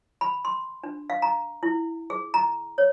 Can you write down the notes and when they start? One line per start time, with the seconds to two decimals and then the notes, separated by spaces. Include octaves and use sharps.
0.21 B5
0.45 C6
0.84 D4
1.10 F5
1.22 A#5
1.63 E4
2.10 G#4
2.34 A#5
2.78 C#5